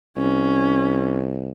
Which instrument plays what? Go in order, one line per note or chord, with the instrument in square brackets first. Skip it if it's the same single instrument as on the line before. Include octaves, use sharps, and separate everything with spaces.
[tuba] C2 [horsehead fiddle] C#4